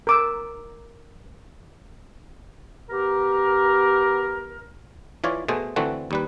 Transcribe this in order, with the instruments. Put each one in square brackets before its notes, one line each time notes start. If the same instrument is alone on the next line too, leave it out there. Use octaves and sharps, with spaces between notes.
[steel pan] A#4 D6 E6
[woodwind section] B3 G4 A#4
[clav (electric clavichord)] E3 F4 C#5 D5
B2 A3 G#4 C5
D3 E3 A3 C4 F#4
D#2 G3 B4